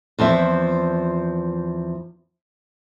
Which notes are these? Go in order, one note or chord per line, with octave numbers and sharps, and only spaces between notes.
E2 F3 C4 E5